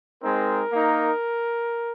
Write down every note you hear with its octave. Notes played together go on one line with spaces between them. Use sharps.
G#3 C4 D#4 A#4
A#3 D#4